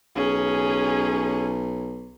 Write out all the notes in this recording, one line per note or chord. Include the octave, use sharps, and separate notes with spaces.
B1 C#4 G#4